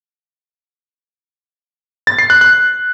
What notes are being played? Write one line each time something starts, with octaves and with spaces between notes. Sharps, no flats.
A6
C7
F#6
F#6